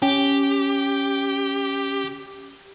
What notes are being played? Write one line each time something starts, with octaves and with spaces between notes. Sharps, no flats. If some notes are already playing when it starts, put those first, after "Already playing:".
C#4 G4